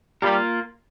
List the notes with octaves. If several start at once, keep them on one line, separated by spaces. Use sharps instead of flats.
G3 A#3 F4 A#4